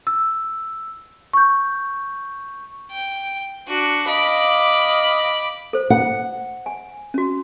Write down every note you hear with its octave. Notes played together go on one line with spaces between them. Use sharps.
E6
C#6 G6
G5
D4 F#4
D#5 F5 B5 D6
A4 C5
F#5
G#5
C#4 F#4